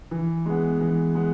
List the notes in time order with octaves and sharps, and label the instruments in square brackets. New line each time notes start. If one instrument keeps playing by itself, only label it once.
[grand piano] E3
G#3 B3
E3
G#3 B3